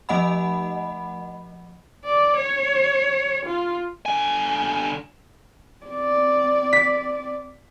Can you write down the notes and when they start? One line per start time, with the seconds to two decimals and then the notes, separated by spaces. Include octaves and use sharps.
0.09 F3 A3 D#5 F#5 B5
2.05 D5
2.36 C#5
3.45 F4
4.06 D3 G#5
5.84 C4 D5
6.73 B6